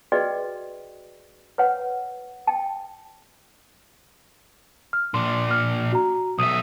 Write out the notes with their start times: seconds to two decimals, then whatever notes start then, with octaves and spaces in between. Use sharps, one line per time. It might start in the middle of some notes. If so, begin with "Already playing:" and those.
0.12 F#4 G#4 B4 D5 D#5 G5
1.58 B4 C#5 F#5
2.47 G5 A5
4.93 F6
5.14 A#2 D4 C6
5.51 F6
5.92 F#4 A#5
6.39 B1 E5 D#6 D#7